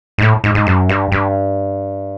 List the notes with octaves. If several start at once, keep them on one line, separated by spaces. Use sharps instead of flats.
G#2
A2
G#2
G#2
F#2
G2
G2